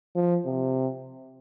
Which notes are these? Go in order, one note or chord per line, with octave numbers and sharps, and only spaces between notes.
F3
C3